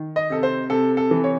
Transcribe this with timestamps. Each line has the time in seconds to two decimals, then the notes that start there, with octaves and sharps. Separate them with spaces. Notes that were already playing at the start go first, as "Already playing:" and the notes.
Already playing: D#3
0.16 D#5
0.30 C3 A4
0.43 C5
0.70 C3 A4
0.97 A4
1.11 E3
1.24 C#5